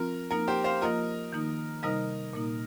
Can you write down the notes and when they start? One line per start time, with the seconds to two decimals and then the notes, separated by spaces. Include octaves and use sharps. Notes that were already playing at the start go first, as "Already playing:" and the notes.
Already playing: F3 C4 F4 A#4
0.31 F3 A#3 D#4 A#4
0.48 G4 C5
0.64 C5 F5
0.81 F3 A#3 F4 A#4 D#5
1.33 D#3 A#3 D#4
1.83 C3 G3 D#4 A#4 D#5
2.33 A#2 A#3 D#4